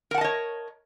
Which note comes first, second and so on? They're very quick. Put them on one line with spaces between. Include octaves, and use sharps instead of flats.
A#4 F#5 A5 D#5 C#5